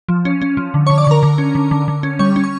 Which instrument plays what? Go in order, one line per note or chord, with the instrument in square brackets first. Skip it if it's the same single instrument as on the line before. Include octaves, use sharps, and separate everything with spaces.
[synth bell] F3
C#4
C#4
F3
D3
D3 C#5 C#6
D5 D6
C#6
D3 A#4 A#5
D3
C#4
D3
D3
D3
C#4
G3 C#5 C#6
C#4
C#6